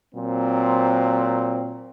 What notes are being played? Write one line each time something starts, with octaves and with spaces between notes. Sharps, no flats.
A#2 F#3 C4